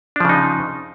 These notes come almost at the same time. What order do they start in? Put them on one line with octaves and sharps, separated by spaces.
D4 F3 C#3 D#4